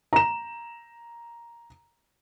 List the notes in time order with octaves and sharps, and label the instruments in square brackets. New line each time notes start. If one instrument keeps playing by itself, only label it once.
[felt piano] A#5 E7